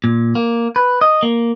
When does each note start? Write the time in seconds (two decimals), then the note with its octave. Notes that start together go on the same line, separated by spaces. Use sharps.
0.04 A#2
0.35 A#3
0.76 B4
1.01 D#5
1.23 A#3